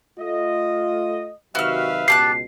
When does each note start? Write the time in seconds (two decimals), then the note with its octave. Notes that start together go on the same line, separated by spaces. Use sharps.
0.19 A3 F4 D#5
1.55 C3 D#3 F#3 F#4 B4 E5 F5 F6
2.08 C#2 B2 G4 A5 F#6 C7